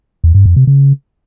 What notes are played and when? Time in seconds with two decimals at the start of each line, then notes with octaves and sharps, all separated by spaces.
0.24 E2
0.35 G2
0.46 F2
0.56 C3
0.67 C#3